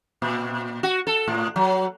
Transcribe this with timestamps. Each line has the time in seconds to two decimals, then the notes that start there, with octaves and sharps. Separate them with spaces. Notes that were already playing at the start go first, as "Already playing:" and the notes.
0.22 A#2
0.83 F#4
1.07 A4
1.28 A2
1.56 F#3